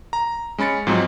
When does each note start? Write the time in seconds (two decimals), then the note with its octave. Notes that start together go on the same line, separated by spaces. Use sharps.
0.13 A#5
0.58 G#3 C#4 B5 A6 C#7
0.87 G#2 F3 F#3 G#3 C4 D#4